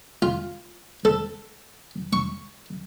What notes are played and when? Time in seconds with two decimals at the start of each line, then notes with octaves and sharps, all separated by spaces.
0.22 F4
1.05 A4
2.13 C#6